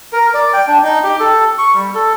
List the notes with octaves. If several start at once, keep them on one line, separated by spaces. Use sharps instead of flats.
A#4
D5
G5
D4
D#4
G4
A4
C#6
G3
A4